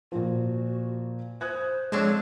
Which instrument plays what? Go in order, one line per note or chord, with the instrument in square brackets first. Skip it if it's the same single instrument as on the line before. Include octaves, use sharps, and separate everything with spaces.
[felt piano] A#2 F3 [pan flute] F#4
[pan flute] C5 [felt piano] D#6 F#6 G#6
[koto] F3 C4 D4 [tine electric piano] G#3 C#5 [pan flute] A4